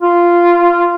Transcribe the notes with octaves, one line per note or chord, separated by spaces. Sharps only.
F4